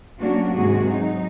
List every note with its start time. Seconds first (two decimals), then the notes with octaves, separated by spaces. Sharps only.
0.19 F#3 A#3 C#4 D4 F#4
0.55 G#2 C3 D#3 F#4 G#4
0.87 F#3 D#4